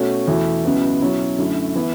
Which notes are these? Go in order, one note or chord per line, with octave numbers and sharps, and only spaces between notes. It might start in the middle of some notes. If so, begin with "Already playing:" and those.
Already playing: B2 A3 C#4 F#4
E2 B2 A3 E4
C#2 C#3 F#3 B3 E4
B2 F#3 C#4 E4
F#2 D3 A3 E4
E3 B3 E4